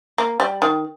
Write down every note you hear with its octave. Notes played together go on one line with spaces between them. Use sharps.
A#3
G3
D#3